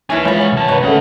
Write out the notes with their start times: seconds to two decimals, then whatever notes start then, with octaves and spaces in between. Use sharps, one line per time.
0.10 D#2 E3 C#4 E5 G#5 E7
0.25 E3 F3 G#3 C#5 B5
0.37 B3 C#4
0.53 C2 A5
0.68 G#1 F#4 B4 C#5
0.84 D2 C#3 A3 F#5